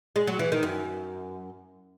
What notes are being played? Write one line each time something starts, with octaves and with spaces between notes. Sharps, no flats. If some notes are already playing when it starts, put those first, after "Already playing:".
G#3
F#3
E3
D#3
F#2